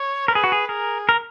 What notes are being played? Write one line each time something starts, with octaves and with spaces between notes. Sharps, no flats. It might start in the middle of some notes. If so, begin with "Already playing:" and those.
Already playing: C#5
A#4 B4
G#4
F#4
G#4
G#4 A#4
A#4